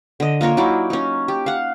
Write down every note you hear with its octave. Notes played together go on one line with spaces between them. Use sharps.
D3 D#5
A#3 F4 A#4 C#5
F#3 D#4 E4 D5
C#4 D#4
G4
F5 F#5